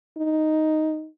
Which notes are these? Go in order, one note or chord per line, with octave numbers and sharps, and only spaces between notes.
D#4